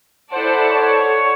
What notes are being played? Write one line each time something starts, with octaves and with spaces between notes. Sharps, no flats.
E4 A4 C5 D5 F#5 A5
C#5